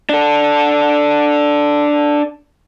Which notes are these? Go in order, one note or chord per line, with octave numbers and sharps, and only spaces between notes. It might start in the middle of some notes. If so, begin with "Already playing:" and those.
D4 A4